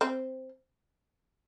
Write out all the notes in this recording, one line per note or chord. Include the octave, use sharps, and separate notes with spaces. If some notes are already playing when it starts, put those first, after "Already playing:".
C4 C5